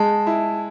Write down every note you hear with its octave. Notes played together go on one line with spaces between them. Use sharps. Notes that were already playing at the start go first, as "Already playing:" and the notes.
Already playing: G#3 A5
E4